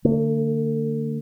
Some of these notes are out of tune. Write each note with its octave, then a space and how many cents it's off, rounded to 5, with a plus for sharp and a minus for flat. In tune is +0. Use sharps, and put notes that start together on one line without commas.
D3 +0 A3 +45